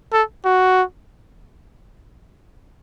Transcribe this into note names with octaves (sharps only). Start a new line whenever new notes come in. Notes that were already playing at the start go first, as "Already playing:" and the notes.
A4
F#4